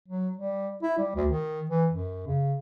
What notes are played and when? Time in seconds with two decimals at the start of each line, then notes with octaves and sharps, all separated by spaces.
0.08 F#3
0.38 G3
0.83 E4
0.98 G3
1.15 D2
1.30 D#3
1.70 E3
1.91 F#2
2.27 C#3